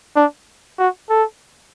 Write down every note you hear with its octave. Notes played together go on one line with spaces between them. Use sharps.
D4
F#4
A4